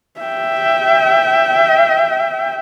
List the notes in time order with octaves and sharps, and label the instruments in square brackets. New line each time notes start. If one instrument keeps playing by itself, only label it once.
[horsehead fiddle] E5 G5